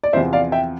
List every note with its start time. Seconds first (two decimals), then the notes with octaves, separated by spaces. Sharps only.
0.03 D5
0.13 E2 C3 F3 C5 E5
0.33 D5 F5
0.52 E5 G5